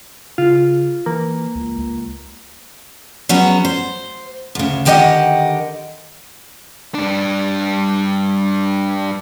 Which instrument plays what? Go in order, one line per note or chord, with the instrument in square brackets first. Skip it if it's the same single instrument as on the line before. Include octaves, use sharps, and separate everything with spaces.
[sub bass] C#3 [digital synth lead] F4
[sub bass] E3 [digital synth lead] A#3
[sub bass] C#2
C#2
[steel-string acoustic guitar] F#3 B3 C#4 G#4
C5
D2 C#3
D3 D#3 G4 A4 D#5 F#5
[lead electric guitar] G2 D4